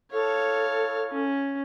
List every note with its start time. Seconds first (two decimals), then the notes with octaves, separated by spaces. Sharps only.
0.11 E4 A4 C#5 F5
1.11 C#4